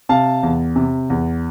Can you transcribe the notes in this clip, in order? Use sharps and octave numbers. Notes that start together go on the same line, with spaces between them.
C3 F5 A5
E2
C3
E2